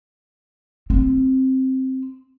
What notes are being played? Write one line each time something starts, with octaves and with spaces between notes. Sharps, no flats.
C4